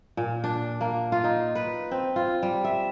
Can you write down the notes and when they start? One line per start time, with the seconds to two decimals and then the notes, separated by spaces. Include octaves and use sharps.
0.17 A#2
0.44 D4
0.81 A#3
1.12 F4
1.24 D#4
1.55 B4
1.91 C4
2.16 F4
2.43 G3
2.64 E5